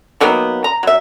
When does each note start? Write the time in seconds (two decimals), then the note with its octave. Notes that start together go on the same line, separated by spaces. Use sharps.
0.20 D#3 F#3 A#3 B3
0.64 A#5
0.83 F#3 E5